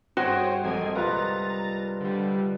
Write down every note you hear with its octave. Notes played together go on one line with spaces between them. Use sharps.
G1 C4 F#4 G#4 C5 C#5 G#5 D7
A#1 G#3 C4 A4 G#5 G#6
C2 F4 B4 F#5 A#5 B5 A6
D3 G3